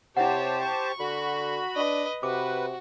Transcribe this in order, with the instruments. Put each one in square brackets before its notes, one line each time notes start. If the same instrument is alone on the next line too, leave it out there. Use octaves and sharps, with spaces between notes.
[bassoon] C3 [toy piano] E4 F#5 [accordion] G4 C5 A5 [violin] C#5
[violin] C#6
[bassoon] D3 [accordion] F#4 B5
[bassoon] D4 [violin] B4 D#5
[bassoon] C3 [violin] F#4 [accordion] B4 [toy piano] D6